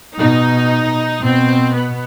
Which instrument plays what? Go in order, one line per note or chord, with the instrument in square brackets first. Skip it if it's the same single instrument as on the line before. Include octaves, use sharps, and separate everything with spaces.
[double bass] B2 [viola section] D#4
[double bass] B2 [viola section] C4
[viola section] B3